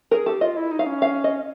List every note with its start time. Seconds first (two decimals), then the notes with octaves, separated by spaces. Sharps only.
0.11 G#4 A#4
0.26 G4 A4
0.41 F4 D#5
0.57 E4
0.71 D#4
0.79 F5
0.86 C#4
1.02 F5
1.24 D#5